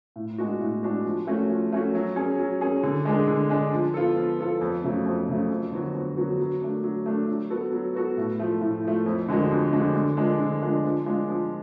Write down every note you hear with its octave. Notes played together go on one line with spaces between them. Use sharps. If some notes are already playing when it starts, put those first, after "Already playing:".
A2
G#3 D4 F#4
A2
G#3 D4 F#4
F3
A3 C#4 F#4
F3
A3 C#4 F#4
F#3
C#4 G#4
F#3
C#4 G#4
D3
G#3 D4 G#4
D3
G#3 D4 G#4
F3
B3 F4 A4
F3
B3 F4 A4
F2
C#3 F#3 A3
F2
C#3 F#3 A3
F2
D3 F#3 B3 F#4
F2
D3 F#3 B3 F#4
F#3
A3 D4
F#3
A3 D4
F#3
B3 F#4 A4
F#3
B3 F#4 A4
A2
F3 A3
A2
F3 A3
F2
D3 G#3 D4 F#4
F2
D3 G#3 D4 F#4
D3
F3 G#3 D4
D3
F3 G#3 D4
F3
G#3 D4 F4
F3